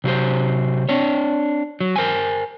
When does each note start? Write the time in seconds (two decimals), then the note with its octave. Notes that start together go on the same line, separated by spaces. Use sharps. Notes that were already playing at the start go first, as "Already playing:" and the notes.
0.04 C3 F#3 G4 C5
0.89 C4 D4 C#5
1.80 F#3
1.96 A#4 C5 G5 G#5